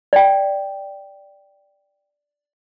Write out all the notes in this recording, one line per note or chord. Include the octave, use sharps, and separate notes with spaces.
D5 G5